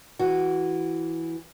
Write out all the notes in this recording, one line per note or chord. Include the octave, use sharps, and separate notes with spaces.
E3 F#4